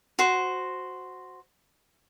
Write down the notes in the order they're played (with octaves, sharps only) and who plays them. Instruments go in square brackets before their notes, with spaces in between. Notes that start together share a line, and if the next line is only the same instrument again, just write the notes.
[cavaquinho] F#4 C5